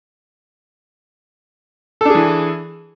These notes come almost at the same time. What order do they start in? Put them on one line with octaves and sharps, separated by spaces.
A4 D4 G#4 E3